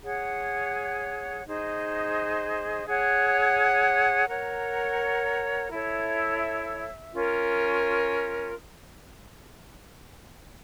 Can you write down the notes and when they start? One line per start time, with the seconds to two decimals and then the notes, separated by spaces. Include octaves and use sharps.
0.03 G#4 C#5 F#5
1.44 D#4 G#4 C5 D#5
2.86 G#4 C#5 F#5
4.28 A#4 C#5 F#5 A#5
5.70 E4 A4 C#5 E5
7.12 C#4 F4 A#4